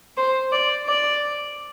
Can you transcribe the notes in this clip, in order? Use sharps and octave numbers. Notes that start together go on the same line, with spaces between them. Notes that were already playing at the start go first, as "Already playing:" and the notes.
C5
D5
D5